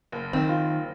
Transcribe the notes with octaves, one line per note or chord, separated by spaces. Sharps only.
F#1
D#3 C4
F4